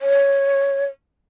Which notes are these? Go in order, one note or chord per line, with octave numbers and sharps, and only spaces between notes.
C#5